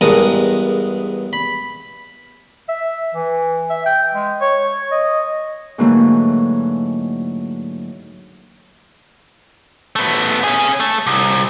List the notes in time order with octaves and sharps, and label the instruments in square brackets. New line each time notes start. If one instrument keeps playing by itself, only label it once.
[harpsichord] E2 G2 G#3 A#4 A5 D#6
B5
[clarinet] E5
E3
E5
G5
G#3
C#5
D#5
[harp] G#2 D3 E3 F#3 A3 A#3
[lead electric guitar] A3 B3
C#4 G#4
A3
C2